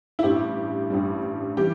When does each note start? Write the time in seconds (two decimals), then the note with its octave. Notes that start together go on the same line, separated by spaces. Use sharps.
0.19 E4
0.23 A1 G2 G3 G4
0.90 A1 G2 G3
1.57 E3 G3 G4